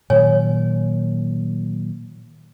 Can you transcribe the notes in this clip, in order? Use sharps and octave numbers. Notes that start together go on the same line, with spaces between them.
A#2 D#3 F#3 C#5 G#5